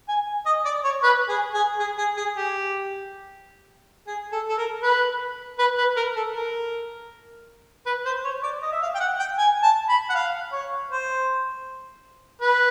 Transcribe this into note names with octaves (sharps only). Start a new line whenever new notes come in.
G#5
D#5
D5
C#5
B4
G#4
G#4
G#4
G#4
G#4
G4
G#4
A4
A4
A#4
B4
B4
B4
A#4
A4
A#4
B4
C5
C#5
D5
D#5
E5
F5
G5
F#5
G5
G#5
A5
B5
F#5
F5
C#5
C5
B4